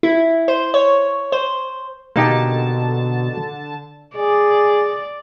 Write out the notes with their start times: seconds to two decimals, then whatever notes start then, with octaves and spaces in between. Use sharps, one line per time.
0.03 E4
0.48 C5
0.74 C#5
1.32 C5
2.16 B2 D3 A#3 D#4 G4 A5
4.17 G#4 D5